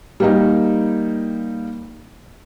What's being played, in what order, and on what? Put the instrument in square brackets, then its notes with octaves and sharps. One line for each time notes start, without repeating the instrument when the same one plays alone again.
[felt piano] G3 A#3 D#4